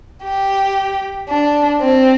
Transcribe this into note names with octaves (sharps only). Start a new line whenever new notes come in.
G4
D4
C4